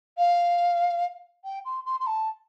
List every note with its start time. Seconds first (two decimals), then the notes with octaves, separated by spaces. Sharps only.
0.17 F5
1.44 G5
1.65 C6
1.85 C6
2.00 C6
2.06 A5